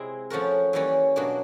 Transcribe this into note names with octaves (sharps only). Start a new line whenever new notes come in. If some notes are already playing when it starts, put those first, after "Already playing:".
Already playing: C3 G#3 C4 E4 G#4
F3 A3 C#4 F#4 A#4
E3 G3 A#3 C#4
B2 F#3 A#3 D4